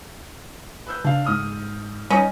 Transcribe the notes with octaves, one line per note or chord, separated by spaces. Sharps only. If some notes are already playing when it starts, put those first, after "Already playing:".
B4 E6 G6
C#3 D4 F5
G#2 D#6 F6
G3 C#4 D#4 B4